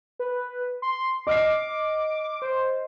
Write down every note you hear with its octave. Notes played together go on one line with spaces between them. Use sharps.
B4
C6
D#5 D6 F6 C7
C5